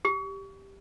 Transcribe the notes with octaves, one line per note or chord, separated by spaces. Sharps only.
G4